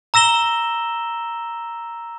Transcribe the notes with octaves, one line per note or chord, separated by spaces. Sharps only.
A#5 E6 A#6 E7 G7